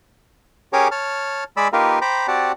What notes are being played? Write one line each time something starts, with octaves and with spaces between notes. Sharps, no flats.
C#4 G4 G#4 A#4 C#5 D6
C#5 A5 F6
G#3 G#4 D5 B5 E6
A#3 D#4 F4 G4 A#4 B4
C5 G5 A#5 B5 D6
C4 F#4 G4 D5 F#5 A5